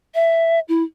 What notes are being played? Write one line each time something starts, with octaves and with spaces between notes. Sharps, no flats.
E5
E4